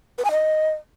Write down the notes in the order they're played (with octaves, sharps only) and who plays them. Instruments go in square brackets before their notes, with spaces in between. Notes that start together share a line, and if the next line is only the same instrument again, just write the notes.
[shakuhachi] B4
G#5
D#5